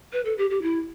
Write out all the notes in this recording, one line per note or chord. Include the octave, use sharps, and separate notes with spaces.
B4
A4
G4
G4
E4